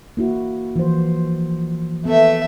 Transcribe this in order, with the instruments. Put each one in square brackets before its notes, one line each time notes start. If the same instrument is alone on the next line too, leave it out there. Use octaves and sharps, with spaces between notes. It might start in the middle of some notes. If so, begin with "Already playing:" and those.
[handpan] A#3 E4 F#4
E3 F3 C5
[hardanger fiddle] A3 E5 [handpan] B3